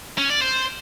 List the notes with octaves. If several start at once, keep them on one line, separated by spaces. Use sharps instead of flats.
C#4
D5
C5